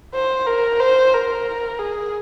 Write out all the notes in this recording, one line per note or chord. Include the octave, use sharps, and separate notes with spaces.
C5
A#4
C5
A#4
G#4